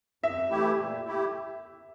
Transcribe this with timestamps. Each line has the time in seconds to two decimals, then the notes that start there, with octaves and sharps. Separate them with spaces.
0.23 F2 E5
0.50 E3 A3 E4 G4
0.77 A#2
1.05 A3 E4 G4